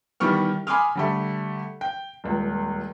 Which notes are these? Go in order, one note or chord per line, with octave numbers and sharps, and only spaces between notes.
D#3 E3 G3 B3 C#6 F6
G#5 B5 C6 D6 D#6 F6
D3 G3 A3
G5
D#1 C#2